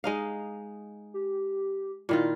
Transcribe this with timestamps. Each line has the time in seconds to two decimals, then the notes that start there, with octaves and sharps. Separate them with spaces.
0.04 G#3 D#4 F5
1.14 G4
2.09 A#2 D#3 E4 F4